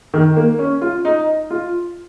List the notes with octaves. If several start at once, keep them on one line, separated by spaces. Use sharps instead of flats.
D#3
A#3
C#4
F4
D#4
F4